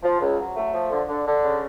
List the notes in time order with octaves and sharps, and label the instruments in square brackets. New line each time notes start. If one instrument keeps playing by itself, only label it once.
[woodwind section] F3
C#2
F#3
A3
F3
D3
D3
D3
C#3